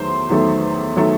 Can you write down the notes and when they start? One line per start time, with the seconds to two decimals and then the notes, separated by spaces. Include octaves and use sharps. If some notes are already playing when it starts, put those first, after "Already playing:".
Already playing: E2 D#3 F#3 A3 C5
0.29 E2 D#3 F#3 A3
0.96 D#3 F#3 A3